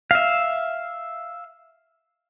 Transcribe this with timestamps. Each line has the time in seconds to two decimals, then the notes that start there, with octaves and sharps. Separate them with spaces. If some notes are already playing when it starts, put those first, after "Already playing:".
0.11 E5 F5